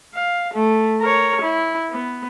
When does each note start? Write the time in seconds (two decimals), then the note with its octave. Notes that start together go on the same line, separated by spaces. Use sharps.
0.14 F5
0.54 A3
1.01 A#4 C#5
1.41 E4
1.91 B3